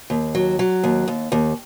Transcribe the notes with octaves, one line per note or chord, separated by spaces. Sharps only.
D#2
F#3
F#3
D#2
D#2
D#2